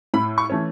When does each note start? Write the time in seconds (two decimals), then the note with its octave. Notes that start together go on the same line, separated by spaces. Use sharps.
0.14 A2 B5
0.38 C#6
0.50 E3 A3 C#4